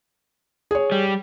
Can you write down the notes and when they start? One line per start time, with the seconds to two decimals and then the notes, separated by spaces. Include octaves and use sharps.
0.71 G#4 C#5
0.92 G3